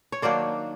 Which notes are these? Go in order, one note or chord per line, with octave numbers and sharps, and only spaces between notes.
C#5
D#3 F#3 A#3 D4 C5 D5